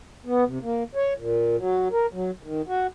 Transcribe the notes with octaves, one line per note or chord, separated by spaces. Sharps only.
B3
C3
A#3
C#5
A#2
F#3
A#4
F#3
D#3
F#4